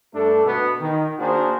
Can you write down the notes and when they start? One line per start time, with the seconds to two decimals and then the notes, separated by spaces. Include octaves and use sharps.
0.14 G2 A3 D4 A4
0.44 B2 B3
0.80 D#3
1.19 A#3 D4 F#4 G#4 A#4 C5